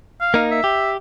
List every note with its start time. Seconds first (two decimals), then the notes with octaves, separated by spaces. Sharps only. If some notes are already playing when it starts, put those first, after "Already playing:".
0.21 F5
0.34 A#3 D#4
0.51 E5
0.64 G4